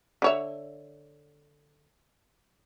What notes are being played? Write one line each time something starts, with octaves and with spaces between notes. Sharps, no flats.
D3 C#5 E5